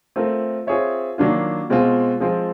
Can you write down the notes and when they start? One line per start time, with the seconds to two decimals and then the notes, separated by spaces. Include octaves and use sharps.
0.16 A3 C4 F4 A#4
0.67 C4 F4 G#4 C#5 E5
1.18 D#3 F#3 A#3 D4 F4
1.70 B2 G#3 C4 F4
2.20 F3 G#3 C4 F4